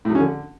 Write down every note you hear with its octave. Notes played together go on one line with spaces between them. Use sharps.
A2
F#3
C#4
D3